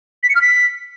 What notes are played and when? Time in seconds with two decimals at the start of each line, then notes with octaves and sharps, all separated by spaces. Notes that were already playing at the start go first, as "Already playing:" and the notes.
0.23 B6
0.29 C#7
0.35 F6
0.41 B6